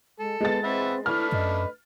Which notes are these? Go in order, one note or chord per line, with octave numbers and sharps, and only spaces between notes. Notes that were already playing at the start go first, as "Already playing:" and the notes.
G#3 A4
G#3 B3 A6
C4 B4 E5 F#5
A3 D4 E4 B4 F6
F#2 D#5